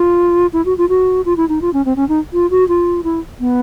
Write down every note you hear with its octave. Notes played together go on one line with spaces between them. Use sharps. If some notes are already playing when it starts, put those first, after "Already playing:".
Already playing: F4
E4
F#4
F4
F#4
F4
E4
D#4
F4
C#4
C4
C#4
D#4
F4
F#4
F4
E4
B3